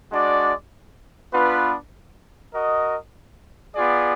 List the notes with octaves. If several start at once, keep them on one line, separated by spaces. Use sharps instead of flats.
G#3 D4 F#4 D5
B3 D4 F4 B4
F#4 A#4 D#5
B3 F4 G#4 D5